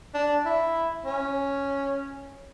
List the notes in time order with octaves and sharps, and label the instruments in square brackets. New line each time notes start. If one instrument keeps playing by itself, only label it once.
[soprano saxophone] D4
E4
C#4